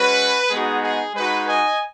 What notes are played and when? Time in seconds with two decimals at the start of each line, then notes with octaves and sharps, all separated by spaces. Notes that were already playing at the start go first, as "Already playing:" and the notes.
Already playing: G#3 C#4 F#4 B4
0.50 G#3 B3 D#4 F#4 G#4
0.82 G#4
1.14 G#3 D#4 F#4 B4
1.47 D#5 G#5